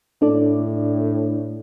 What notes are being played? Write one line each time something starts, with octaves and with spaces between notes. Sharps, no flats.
A2 D4 A4 D5